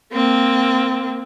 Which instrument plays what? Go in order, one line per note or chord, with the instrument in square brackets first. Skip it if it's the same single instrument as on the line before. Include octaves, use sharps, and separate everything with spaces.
[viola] A#3 C4